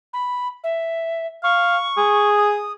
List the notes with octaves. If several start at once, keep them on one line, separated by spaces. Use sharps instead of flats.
B5
E5
F5 C#6
G#4
D#6